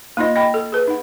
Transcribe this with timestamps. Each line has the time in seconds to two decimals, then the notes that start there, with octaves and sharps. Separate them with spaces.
0.17 A#3 D#4 F4 D#5
0.36 D#5 G5 B5
0.54 A4
0.72 G#4 B4
0.87 D#4 F#5